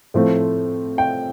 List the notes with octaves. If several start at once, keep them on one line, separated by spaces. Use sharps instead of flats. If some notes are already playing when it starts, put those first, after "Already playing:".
A2 F3 A3 C4
G5